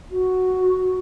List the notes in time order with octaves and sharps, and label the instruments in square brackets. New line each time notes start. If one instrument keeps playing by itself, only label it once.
[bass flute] F#4